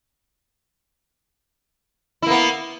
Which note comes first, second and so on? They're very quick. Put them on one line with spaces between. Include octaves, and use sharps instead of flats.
E4 A#3 B3